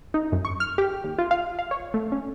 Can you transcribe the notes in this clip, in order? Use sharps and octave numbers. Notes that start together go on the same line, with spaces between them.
D#4
F#2
C#6
F6
G4
D#2
F4
F5
F5
C#5
A3
C#4